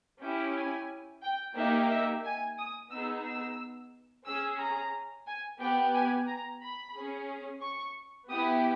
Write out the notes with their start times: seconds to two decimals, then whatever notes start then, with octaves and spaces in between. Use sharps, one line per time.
0.22 C#4 E4 G4 G5
0.56 G#5
1.23 G5
1.57 A#3 D#4 G4 E5
1.90 E5
2.25 G#5
2.58 D#6
2.91 B3 D#4 G#4 E6
3.25 E6
4.26 C#4 G#4 E6
4.59 A#5
5.27 G#5
5.60 B3 G4 G5
5.95 G#5
6.28 A#5
6.62 B5
6.96 C#4 G#4
7.62 C#6
8.30 B3 E4 G4 D#6